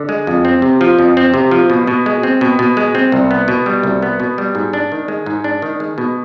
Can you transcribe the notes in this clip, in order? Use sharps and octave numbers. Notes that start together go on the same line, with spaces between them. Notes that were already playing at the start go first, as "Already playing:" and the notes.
Already playing: D3
G#3
F2
C4
C3
F3
F2
C4
C3
F3
B2
B2
G#3
C4
B2
B2
G#3
C4
C2
B3
B2
G3
C2
B3
B2
G3
G#2
D4
D#3
G#3
G#2
D4
D#3
G#3
B2